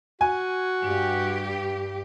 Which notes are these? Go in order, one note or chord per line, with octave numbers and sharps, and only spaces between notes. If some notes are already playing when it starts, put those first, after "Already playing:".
F#4 G#5
G2 G4